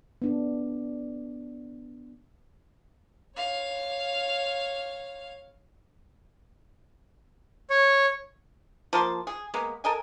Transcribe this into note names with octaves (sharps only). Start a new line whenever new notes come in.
B3 D4
C#5 F5
C#5
F3 A#3 A5 C6
G#4
G#3 A#3 B3
A4 A#4 D#5 G#5